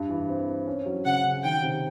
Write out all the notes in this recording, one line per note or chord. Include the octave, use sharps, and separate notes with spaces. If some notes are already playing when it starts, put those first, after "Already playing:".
Already playing: G2
E3
C4
C4
C#4
F#3
C#3 F#5
C#3
D#3 G5
C3